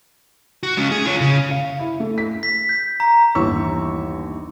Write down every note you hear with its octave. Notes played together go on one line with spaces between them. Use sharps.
F#4
G#3 C#4
G#4
F4 C#5
C#3
F5
E4
A3
B6
B6
G6
A#5
G1 D#2 E3 C#6 E6